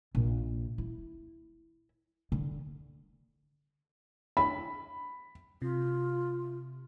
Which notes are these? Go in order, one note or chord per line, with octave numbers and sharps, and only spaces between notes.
A#1
E4
D3
B5
C3 F4